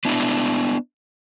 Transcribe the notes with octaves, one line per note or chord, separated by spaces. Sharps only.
B3 D4 E4